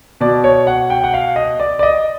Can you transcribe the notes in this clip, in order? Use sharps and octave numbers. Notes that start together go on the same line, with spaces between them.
B2 D5
C#5
F#5
G5
F#5
F5
D#5
D5
D5
D#5